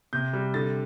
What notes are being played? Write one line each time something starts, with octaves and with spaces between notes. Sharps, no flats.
C3 G6
G3
D3 A6